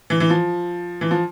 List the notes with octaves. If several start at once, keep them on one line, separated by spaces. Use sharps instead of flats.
E3
E3
F3
E3
F3